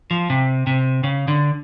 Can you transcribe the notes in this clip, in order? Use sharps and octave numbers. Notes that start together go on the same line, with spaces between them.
F3
C3
C3
C#3
D3